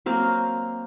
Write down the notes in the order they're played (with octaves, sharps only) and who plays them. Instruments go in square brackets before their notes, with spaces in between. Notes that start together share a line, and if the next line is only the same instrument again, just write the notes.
[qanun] F#3 A#3 C4